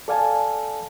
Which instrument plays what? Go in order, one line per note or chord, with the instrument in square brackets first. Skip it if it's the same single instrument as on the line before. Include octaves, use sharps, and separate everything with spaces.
[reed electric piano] A4 D5 F5 G#5 A5